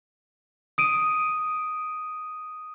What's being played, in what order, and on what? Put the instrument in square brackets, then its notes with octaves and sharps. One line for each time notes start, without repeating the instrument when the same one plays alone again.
[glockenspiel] D#6 D7 D#7